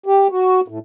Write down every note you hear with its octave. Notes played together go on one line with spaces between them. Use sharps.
G4
F#4
A2